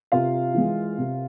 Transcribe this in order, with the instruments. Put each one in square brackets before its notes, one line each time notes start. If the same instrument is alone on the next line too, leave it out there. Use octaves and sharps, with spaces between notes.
[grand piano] C3 [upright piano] F4 F5
[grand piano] E3 G#3
C3